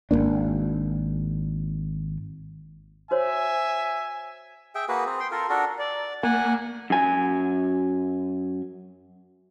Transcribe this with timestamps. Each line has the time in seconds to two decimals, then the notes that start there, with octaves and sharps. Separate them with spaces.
0.11 G#1 G#2 A#3 D4
3.11 F#4 C5 C#5 E5 G#5
4.75 G#4 E5 G5
4.88 A#3 F#4 G#4 B4
5.06 C4 G#4
5.20 G5 C6
5.31 F4 A4 A#4
5.50 D4 F#4 A4 A#4
5.79 D5
6.23 A#3 F#5 G#5
6.90 F#2 G#5